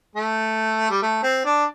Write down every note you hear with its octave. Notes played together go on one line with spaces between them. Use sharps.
A3
G3
A3
C4
D4